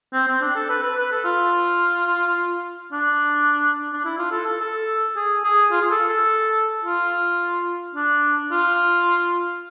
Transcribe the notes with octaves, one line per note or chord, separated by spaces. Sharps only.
C4
C4
D4
A4
B4
B4
B4
A4
F4
D4
D4
E4
F4
A4
A4
A4
G#4
G#4
F4
G#4
A4
A4
F4
D4
F4